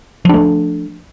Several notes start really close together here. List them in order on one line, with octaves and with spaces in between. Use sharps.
F3 D4 A3